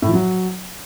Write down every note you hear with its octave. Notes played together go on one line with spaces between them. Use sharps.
A2
F3
F#3